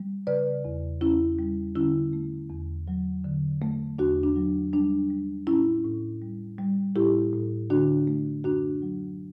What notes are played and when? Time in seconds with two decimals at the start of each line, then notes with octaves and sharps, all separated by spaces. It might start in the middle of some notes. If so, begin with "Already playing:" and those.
Already playing: G3
0.27 C#3 B4 D5
0.65 E2
1.01 E2 C#4 E4
1.39 G3
1.75 D3 C#4 E4
2.13 A3
2.50 E2
2.88 F#3
3.24 D3
3.62 A3
3.99 E2 D4 F#4
4.23 D4
4.36 F#3
4.73 G3 D4
5.10 G3
5.47 A2 C#4 E4
5.84 A2
6.22 G3
6.58 G3
6.96 A2 E4 G4
7.33 A2
7.70 D3 D4 F#4
8.07 A3
8.44 F#2 D4 F#4
8.82 F#3